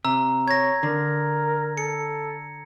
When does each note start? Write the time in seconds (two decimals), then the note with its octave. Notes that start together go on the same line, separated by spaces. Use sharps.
0.05 C3 A#5 E6
0.48 C#5 G#6 A#6
0.83 D3 A#4
1.78 A4 C#7